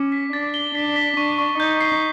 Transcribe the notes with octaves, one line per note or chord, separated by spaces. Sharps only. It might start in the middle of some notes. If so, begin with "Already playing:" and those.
Already playing: C#4 D6
B6
D4 A6
G7
D4 B6
B6
D4 C#6
C#6
D#4 G6
C7